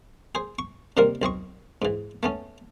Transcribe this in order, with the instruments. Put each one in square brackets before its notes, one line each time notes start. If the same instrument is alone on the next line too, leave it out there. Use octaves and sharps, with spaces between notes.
[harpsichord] G#4 C5
C#6
C3 D#3 G3 A#3 C4 A#4
B1 C4 D#5 C#6
G#2 E3
A3 B3 C#4